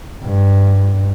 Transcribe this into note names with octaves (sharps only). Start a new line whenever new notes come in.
G2